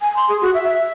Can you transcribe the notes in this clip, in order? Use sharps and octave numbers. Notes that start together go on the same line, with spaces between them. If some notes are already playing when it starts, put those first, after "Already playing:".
G#5
C6
G#4
F#4
E5
E5